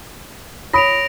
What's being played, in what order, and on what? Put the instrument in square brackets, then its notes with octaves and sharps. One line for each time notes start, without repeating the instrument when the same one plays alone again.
[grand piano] C#5 B5 D#6 [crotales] A#6 D7 F7